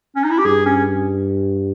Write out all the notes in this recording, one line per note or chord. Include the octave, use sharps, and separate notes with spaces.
C#4
D#4
E4
G4
G2 G#4
C#4